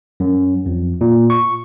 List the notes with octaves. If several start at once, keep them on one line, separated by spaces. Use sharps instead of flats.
F#2
F2
A#2
C#6